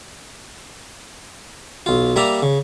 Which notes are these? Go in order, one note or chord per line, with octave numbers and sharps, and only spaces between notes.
B1 F4
G3 A#3 D5 E5 A#5
C#3